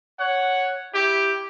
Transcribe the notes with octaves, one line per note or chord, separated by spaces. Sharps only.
C#5 F#5
E4 G4